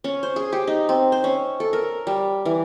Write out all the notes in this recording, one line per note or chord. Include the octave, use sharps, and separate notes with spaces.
C#4
C5
G#4
G4
D#4
C4
C5
C#4
A4
A#4
G3
E3